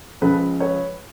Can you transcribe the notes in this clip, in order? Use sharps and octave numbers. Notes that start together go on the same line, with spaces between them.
C#2 C#3 F3 A4 B4
B4 C#5